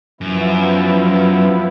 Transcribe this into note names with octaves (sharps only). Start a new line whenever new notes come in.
F#2 F3 B3 E4